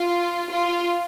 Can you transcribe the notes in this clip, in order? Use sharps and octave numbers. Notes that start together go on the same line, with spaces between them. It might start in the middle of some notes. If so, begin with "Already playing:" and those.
Already playing: F4
F4